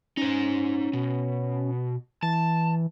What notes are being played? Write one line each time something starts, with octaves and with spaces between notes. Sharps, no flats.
C#4 D#4 C5
B2
E3 A5